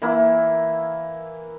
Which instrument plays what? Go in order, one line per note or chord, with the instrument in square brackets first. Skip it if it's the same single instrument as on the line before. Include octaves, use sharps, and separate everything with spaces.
[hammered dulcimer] E3 A#3 E4